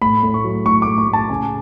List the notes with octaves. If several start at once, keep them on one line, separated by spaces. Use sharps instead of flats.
A2 B5
A2
C#6
F#3
A2 C#6
A2 D6
C#6
A2
A5
C#3 G#5